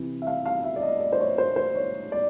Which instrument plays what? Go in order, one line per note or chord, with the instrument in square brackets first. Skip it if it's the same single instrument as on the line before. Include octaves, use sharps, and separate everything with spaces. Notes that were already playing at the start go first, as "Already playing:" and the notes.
Already playing: [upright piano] C3 E3
E5
F5
F5
E5
D5
D#5
D5
C5
C#5
C5
C5
C#5
D5